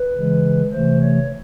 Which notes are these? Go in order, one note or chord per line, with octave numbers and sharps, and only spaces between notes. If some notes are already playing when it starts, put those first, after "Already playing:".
Already playing: B4
C#3 E3 G#3
C3 E3 A3 C5
C#5